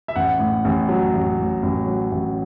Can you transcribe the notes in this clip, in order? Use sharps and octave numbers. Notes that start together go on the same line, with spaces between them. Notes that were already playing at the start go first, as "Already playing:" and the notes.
E5
A1 F#5
A2
A1
F#3
A1
A2
A1
F#3
A1